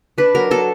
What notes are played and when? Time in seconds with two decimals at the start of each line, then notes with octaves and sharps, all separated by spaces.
0.18 D4 B4
0.35 F#3 A#4
0.51 F#3 A4